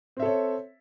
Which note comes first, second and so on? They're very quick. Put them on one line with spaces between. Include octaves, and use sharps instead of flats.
C4 E5 A4 C#5